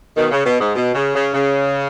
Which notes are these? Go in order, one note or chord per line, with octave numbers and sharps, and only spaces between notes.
B2 D#3
C#3
B2
G#2
B2
C#3
C#3
C#3